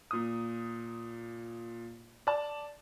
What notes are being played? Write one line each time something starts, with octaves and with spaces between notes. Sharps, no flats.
A#2 D#6
D5 A5